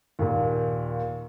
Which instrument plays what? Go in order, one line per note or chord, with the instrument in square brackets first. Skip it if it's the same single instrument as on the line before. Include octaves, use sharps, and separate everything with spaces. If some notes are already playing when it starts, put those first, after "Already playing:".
[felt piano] D#2 A#2